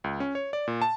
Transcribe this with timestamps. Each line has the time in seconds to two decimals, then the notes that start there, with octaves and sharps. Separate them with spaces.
0.04 C#2
0.20 C#4
0.35 C#5
0.53 D5
0.68 A#2
0.82 A5